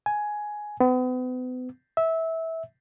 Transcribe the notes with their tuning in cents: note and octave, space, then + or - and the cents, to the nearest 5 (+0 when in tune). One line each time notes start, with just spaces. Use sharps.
G#5 +10
B3 +40
E5 -20